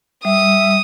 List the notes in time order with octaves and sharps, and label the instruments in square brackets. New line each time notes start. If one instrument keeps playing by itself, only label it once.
[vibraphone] G3 [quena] E5 [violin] D#6